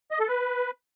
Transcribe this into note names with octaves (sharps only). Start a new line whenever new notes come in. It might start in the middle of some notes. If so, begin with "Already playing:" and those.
D#5
A4
B4